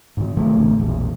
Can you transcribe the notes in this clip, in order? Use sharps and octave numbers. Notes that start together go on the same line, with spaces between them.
G#2 D#3
B2 D#3 F3 A3
A1 D2
E1 A#1